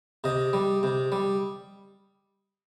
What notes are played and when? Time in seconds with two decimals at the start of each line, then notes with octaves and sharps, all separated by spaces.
0.24 C3 D#5
0.53 G3
0.83 C3
1.12 G3